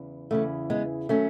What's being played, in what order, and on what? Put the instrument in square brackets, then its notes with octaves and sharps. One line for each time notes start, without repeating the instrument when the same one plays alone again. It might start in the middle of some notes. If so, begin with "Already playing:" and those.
Already playing: [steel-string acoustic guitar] E2 C#3 E3
E2 C#3 E3 A3
G#3 B3
D#3 F#3 A3 C#4